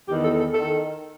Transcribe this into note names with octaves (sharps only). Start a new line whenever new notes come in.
E2 D#3 G4
A4
A4
D#3 A4